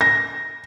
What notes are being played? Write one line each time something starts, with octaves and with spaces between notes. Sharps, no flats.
A#6